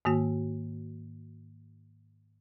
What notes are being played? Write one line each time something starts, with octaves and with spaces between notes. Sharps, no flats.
G#2 D#3 A#3 F#4